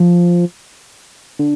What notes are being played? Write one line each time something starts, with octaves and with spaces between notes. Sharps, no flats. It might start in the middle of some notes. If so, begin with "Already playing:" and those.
Already playing: F3
D3